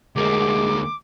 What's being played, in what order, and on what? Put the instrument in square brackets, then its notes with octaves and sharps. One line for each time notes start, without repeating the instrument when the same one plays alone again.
[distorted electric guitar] D2 A#3 [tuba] G#3 [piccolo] D6